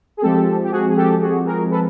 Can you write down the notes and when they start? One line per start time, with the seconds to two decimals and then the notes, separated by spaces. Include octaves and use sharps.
0.17 G#4
0.22 F3 G#3 C4 G4 A4
0.64 G4
0.71 F#4 G#4
0.89 G#4
0.96 G4 A4
1.21 F#4 G#4
1.46 G#4 A#4
1.71 A4 B4